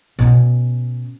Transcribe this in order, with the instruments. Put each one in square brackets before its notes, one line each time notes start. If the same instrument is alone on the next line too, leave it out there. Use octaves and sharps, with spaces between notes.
[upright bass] B2 C#4